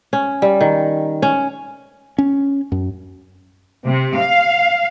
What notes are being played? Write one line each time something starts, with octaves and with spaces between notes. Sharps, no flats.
C#4
G3
D#3
C#4
C#4
F#2
C3
F5